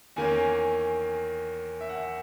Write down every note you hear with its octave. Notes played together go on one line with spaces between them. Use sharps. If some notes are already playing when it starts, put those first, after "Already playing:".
E2 D#3 A#3 C#4 G#5
E5
F#5
E5